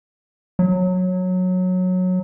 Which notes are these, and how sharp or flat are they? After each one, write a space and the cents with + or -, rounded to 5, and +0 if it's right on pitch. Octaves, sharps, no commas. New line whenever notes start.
F#3 -15